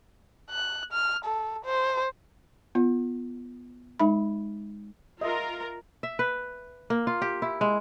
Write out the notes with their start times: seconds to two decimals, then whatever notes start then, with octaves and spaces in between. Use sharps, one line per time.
0.51 F#6
0.92 F6
1.25 A4
1.65 C5
2.75 B3 F4
4.00 G#3 D#4 E5 B5
5.21 F4 A#4 D#5 E5 C6
6.03 E5
6.19 B4
6.90 A#3
7.07 F4
7.22 G4
7.42 E4
7.61 G#3